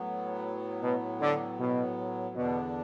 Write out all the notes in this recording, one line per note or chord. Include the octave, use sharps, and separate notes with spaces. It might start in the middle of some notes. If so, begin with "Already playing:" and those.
Already playing: A2 F#3 B3
B2
D3
B2
E2 B2 D3 B3 D4